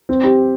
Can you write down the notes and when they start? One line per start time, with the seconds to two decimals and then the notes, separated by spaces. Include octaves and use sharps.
0.09 C4
0.24 G4